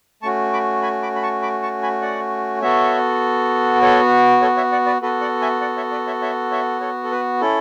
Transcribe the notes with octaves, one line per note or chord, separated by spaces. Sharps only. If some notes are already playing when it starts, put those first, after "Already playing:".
A3 C#4 F#4 A5 C#6
B5 D6
G#5 B5
B5 D6
B5
A5 C#6
B5 D6
A5 C#6
G#5 B5
D5 F#5
B3 F#4 A4 C#5 E5
A4 C#5
A4 C#5
C#5 E5
D5 F#5
B4 D5
B3 F#4 A4 B4
D5 F#5
E5 G#5
D5 F#5
C#5 E5
B4 D5
C#5 E5
C#5 E5
C#5 E5
A4 C#5
A4
B4
C#4 E4 A4